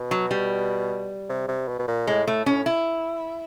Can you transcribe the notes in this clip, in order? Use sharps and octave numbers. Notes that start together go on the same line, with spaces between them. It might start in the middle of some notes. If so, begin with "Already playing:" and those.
Already playing: B2
F#3
G3
C3
C3
B2
B2
A#2
A2 G#3
A2 A3
A2 C#4
E4